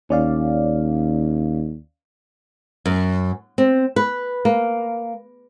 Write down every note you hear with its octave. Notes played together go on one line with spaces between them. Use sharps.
D#2 C#4 D5 F5
F#2
C4
B4
A#3